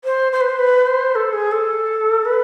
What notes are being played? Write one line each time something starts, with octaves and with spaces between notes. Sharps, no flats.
C5
C5
B4
C5
B4
C5
A4
G#4
A4
B4